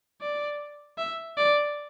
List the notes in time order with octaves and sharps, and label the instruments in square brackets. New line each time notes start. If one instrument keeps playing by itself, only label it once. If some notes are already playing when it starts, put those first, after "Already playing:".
[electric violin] D5
E5
D5